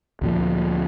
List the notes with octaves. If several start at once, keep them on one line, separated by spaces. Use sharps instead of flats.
D2 A#2 F3